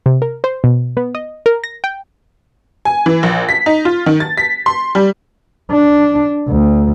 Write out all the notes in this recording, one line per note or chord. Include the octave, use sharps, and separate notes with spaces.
C3
A#4
C5
B2
B3
D#5
A#4
A#6
G5
G#5
E3
A#1
B6
D#4
F4
D#3
A6
B6
C6
G3
D4
D2